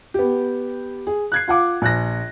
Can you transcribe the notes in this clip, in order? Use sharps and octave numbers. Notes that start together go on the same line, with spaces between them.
B3 G4
G#4
F#6 G#6 C7
F4 F#5 D6
A#1 F#6 A#6